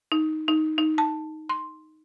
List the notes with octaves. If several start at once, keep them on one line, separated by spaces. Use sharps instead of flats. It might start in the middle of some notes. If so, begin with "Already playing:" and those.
D#4
D#4
D#4
A5
C6